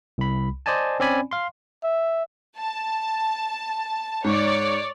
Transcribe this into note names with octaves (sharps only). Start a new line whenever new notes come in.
C2 B5
C5 D5 D#5 G#5 A5
C4 C#4 D5 G#5 B5
F5 C6
E5
A5
G#2 C#5 D5